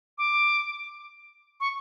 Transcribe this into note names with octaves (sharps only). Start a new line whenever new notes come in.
D6
C#6